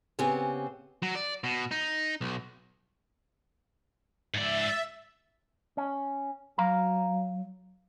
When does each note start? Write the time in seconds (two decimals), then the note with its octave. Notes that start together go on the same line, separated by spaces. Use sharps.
0.19 C#3 B3 C4 G4 G#5
1.03 F#3
1.15 D5
1.44 B2
1.71 D#4
2.21 B1
4.34 G#2 D5 E5
5.77 C#4
6.58 F#3 F5 A#5